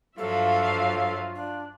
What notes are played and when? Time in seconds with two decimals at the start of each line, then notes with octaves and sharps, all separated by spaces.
0.18 G2 F3 F#3 F4 A4 E5 F5
1.35 D4